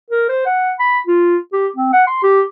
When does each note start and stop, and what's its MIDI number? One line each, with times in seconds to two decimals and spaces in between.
0.10 0.28 70
0.29 0.45 72
0.46 0.73 78
0.79 0.99 83
1.07 1.37 65
1.53 1.68 67
1.77 1.92 60
1.93 2.04 78
2.07 2.19 84
2.23 2.42 67